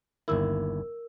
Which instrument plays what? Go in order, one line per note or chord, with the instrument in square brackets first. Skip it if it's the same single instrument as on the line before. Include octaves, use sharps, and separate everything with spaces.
[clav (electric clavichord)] G1 D#2 E4 [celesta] A#4 E6